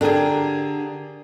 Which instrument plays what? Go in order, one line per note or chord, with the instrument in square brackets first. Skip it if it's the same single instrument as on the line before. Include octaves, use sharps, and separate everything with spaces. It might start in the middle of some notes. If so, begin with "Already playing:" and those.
[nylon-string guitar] D3 A#4 [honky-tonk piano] D4 G4 G#4